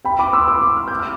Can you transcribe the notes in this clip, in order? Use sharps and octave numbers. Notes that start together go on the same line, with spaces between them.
G5 B5
B5 D6
C6 E6
B5 D6
B5 D6
F6
G6
D6 F6